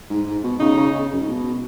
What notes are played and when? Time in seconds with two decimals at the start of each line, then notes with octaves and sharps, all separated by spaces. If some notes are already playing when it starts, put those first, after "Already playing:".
0.10 G#2
0.27 G#2
0.44 B2
0.60 C#3 D#4
0.77 C#3
0.94 C#3
1.13 F#2
1.21 G#2
1.28 B2